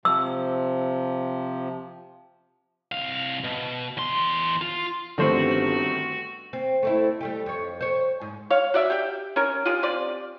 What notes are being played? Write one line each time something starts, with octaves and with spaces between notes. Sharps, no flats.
C3 F3 E6
C2 F5
B2
E2 C6
F4
G1 D3 D#3 F3 A3 C4 F#4 C5
C4
A3 C4 E4
G3 A3 G4
F2 C#5
C5 C#5
G#2
C#5 F5
F#4 D5 E5
G4 G5
C#4 A#4
F4 G4 G#4
C4 F4 G4 D5